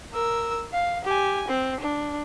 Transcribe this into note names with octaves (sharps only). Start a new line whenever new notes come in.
A#4 E6
F5
G4 G#5
C4
D4